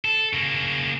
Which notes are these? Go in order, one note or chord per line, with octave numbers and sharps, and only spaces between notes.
A4
C#3 A#3